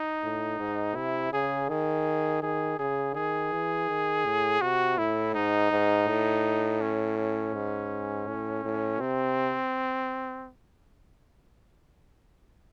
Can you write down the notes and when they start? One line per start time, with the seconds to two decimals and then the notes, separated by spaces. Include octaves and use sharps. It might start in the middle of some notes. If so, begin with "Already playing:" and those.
Already playing: D#4
0.23 A2
0.59 G#2
0.95 C3 E4
1.32 C#3 G#4
1.69 D#3 G#4
2.42 D#3 G#4
2.79 C#3 G#4
3.15 D#3 G#4
3.52 E3
3.89 D#3
4.25 A2
4.61 C3 F#4
4.98 A2 E4
5.35 G#2 D#4
5.72 G#2
6.08 A2
6.81 C#4
7.18 C#4
7.54 G#2
8.27 A2
8.64 A2
9.00 C3 C4